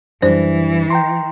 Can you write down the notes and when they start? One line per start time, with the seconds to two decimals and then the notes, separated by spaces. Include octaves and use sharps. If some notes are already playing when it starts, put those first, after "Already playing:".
0.22 F#2 E3 G3 D4 C5
0.90 G5 A#5 C6